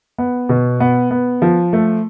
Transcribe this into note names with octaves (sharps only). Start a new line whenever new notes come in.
B3
B2
B3
B3
F3
A3